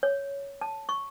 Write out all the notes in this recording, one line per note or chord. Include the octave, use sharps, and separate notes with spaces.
C#5
A5
C#6